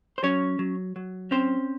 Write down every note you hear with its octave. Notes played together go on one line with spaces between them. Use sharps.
C5
F#3 C#4 C#5
F#3
F#3
C4 C#4 C5